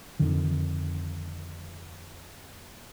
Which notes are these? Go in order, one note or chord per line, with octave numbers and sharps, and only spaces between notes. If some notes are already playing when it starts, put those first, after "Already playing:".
F2 D3 D#3